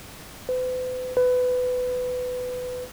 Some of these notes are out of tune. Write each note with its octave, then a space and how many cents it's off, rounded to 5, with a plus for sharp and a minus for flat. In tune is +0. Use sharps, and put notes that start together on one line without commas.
B4 +45
B4 +20